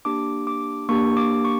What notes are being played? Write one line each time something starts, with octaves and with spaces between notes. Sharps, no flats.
A#3 D4 G4 D6
D6
A#3 D4 G4 C#6
D6
C#6